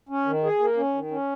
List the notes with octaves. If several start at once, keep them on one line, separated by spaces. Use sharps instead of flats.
C#4
D#3
G#4
A#3
C#4
D#3
C#4